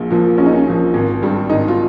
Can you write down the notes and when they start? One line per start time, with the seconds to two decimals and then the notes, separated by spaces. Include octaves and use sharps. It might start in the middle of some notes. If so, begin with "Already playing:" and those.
Already playing: A#1 A#2 F3
0.10 A#2 F3
0.38 A#1 C#4
0.46 D#4
0.53 C#4
0.66 A#2 F3
0.94 G#1
1.22 G2 G3
1.49 G#1 D#4
1.68 F4